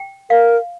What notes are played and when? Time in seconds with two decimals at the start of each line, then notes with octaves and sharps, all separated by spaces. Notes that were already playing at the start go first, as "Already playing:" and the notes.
Already playing: G5
0.30 A#4 F5